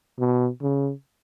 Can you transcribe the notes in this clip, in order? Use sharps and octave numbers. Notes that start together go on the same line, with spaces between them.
B2
C#3